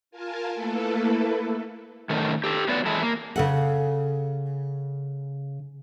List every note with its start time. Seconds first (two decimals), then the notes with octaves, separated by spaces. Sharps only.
0.11 F4 A#4 F5 G#5 A5
0.54 A3 A#3 E4 A4 B4
2.10 D#3 A3 C#4
2.44 G4 A4
2.68 F#3 B3 D5 E5 F#5
2.86 E3 G#3 E4 A4
3.02 A#3
3.36 C#3 A4 F#5